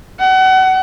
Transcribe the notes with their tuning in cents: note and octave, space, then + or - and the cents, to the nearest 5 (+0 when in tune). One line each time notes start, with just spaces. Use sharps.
F#5 +30